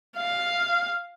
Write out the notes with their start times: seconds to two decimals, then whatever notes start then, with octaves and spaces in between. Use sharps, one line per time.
0.17 F5